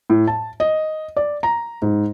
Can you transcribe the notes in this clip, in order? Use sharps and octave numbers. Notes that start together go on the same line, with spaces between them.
A2
A5
D#5
D5
A#5
G#2